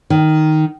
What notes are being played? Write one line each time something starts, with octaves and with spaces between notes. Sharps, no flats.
D#3